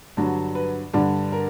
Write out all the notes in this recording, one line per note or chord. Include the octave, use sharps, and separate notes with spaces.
G2 D3 F#3
B4
G2 D3 G3
A#4